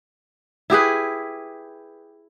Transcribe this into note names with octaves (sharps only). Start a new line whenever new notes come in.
E4 G4 G#4 B4